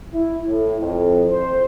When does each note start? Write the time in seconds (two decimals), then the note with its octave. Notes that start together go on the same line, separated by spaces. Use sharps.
0.13 E4
0.47 A2
0.80 F2
1.32 C5